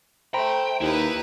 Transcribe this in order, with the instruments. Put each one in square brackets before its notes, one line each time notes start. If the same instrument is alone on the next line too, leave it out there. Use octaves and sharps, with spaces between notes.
[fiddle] A3 [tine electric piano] C5 A#5 B5 [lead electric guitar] G5
[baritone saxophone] D#2 [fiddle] D#4 B4 [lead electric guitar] E4